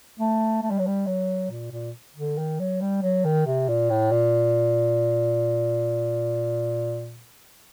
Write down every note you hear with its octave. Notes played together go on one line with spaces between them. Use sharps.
A3
A3
G3
F#3
G3
F#3
A#2
A#2
D3
D#3
F#3
G3
F#3
D#3
C3
A#2
A2
A#2